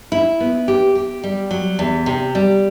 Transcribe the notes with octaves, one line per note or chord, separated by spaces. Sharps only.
E4
B3
G4
G4
G3
F#3
E2
C3
G3